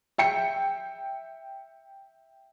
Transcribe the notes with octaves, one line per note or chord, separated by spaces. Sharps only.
E5 G5 C#7